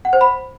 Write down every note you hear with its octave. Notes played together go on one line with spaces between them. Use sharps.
F#5
C5
B5